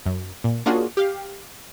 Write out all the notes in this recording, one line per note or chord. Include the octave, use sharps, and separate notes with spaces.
F#2
A#2
A#3 C#4 D4 F4 F#4 G#4
G4 F5